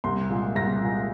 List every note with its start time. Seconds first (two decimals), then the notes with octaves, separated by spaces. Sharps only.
0.04 C2 C6
0.30 A#2 G#3
0.55 C2 A#6
0.81 A#2 G#3